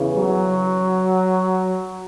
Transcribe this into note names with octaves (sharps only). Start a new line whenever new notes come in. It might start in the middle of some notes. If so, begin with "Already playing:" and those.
Already playing: E2 C#3 E3
F#3